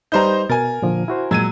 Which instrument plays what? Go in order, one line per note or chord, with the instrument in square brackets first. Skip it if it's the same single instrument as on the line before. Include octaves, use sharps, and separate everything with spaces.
[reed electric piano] G3 B4 G6 [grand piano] D#4 C5 A#5
[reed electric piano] B2 A6 [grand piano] A#4 G#5
[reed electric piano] A#2 D3 F3
E4 F#4 C5
[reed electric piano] A#2 G#3 E6 [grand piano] F#3 G#6 D#7